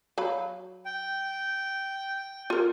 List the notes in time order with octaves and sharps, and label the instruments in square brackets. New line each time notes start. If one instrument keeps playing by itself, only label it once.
[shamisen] F#3 F5 B5
[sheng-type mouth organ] G5
[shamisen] F4 A#4